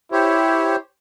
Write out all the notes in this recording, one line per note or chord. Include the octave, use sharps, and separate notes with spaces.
E4 G4 C5 C#5